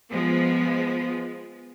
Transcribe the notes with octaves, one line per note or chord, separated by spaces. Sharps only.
F3 G#3 B3